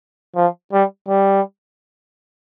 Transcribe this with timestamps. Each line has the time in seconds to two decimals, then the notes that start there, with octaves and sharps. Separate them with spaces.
0.36 F3
0.73 G3
1.08 G3